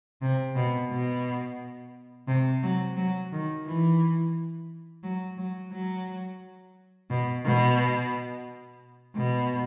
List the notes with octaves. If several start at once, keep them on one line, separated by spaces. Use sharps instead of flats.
C3
B2
B2
C3
F#3
F#3
D#3
E3
F#3
F#3
F#3
B2
B2
B2